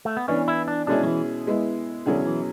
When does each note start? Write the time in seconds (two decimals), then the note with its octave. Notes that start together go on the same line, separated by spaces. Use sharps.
0.05 A3
0.17 B3
0.28 E3 B3 C#4 D4
0.48 E4
0.68 D4
0.87 B2 G#3 C#4 D4 E4 G#4
1.03 F#3
1.07 E3
1.47 G#3 B3 E4
2.06 B2 D3 F#3 C#4 E4 G#4
2.26 E3